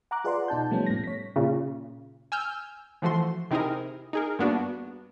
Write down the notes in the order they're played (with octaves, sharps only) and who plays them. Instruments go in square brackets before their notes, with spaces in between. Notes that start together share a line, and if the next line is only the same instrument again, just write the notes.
[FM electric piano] F#5 A#5 D6 F#6
F4 G#4 B4 D5 F#5 C6
B2 D#4 A5 G6
C3 F3 G3 A3 B3 C#4
A2 A#6
C#5 B6
[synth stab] A#2 C#3
[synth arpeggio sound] G#5 E6 F6 G6
E3 F3 A3 F#4 C6
C3 C4 D#4 E4 G#4 A#4
D#4 G#4 A#4
G2 A#3 B3 D4 F#4